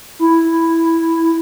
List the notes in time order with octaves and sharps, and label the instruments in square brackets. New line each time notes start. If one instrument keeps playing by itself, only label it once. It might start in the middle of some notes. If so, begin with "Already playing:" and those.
[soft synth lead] E4